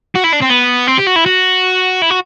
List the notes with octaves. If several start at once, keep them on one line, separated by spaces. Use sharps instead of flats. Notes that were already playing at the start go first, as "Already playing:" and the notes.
F#4
E4
D4
C4
B3
C4
G4
F#4
E4
F#4
E4
F#4